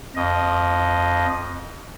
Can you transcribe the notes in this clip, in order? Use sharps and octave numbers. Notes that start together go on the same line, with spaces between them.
F2 D#5